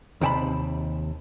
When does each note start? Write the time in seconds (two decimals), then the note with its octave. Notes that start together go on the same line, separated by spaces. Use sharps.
0.21 D#2 C3 G5 A5 B5